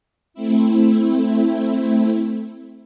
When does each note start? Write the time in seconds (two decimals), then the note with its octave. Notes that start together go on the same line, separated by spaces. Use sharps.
0.34 A3 C4 E4